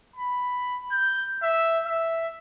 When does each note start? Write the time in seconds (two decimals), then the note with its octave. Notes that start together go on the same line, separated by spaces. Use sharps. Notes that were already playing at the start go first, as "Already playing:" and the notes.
0.16 B5
0.92 G6
1.43 E5
1.86 E5